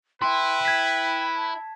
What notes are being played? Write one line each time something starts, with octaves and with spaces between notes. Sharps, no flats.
E4 B4 G5 C6
G#6 B6
A5